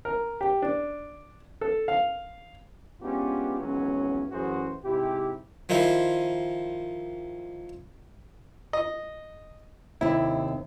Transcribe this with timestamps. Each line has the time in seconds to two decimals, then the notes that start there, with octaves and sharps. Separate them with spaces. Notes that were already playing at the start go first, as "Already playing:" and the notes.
0.05 A#4
0.41 G4
0.62 D4
1.61 A4
1.88 F5
3.01 G#3 B3 C#4 D4 F4 G4
3.60 G#1 C#2 E3 F#3 B3 C#4
4.31 A1 F#2 E3 F#4 G#4 C5
4.84 G#2 C3 E4 G4
5.69 D#3 F3 D#4 E4 C5
8.73 D#5
10.01 D#2 C3 E4